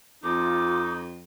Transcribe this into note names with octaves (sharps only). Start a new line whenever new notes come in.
F2 D#4 F4 D6